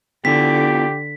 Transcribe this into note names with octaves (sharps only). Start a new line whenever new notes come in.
D3 B3 E4 F4 G4 B6